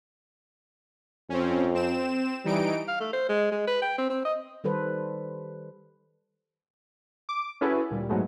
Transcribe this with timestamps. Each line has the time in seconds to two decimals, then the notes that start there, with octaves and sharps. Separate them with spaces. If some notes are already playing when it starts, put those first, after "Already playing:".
1.30 F2 C4 C#4
1.75 C4 E7
2.45 E3 G3 D#4 D7
2.88 F5
3.01 A3
3.13 C5
3.29 G#3
3.52 G#3
3.68 B4
3.82 G5
3.98 C4
4.10 C4
4.25 D#5
4.64 D#3 G3 A4 B4 C5
7.29 D6
7.61 C#4 E4 F#4 G#4 A4 B4
7.90 D2 A#2 G3
8.09 G#2 F#3 G#3 A3 B3